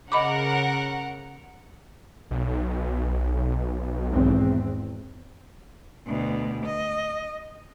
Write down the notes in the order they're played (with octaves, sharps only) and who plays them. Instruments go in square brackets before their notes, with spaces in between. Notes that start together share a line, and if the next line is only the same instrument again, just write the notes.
[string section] C#3 A#4 F#5 [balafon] D#5 B5 D6
[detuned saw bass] B1
[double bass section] G#1 E2 C4
[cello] D2 B2
D#5